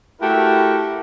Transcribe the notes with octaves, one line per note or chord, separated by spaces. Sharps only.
A3 E4 F#4 G4 A#4